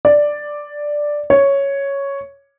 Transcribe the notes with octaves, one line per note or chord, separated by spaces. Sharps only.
D5
C#5